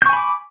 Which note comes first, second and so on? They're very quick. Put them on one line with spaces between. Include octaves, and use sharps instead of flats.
G6 C#6 G#5 B5 D6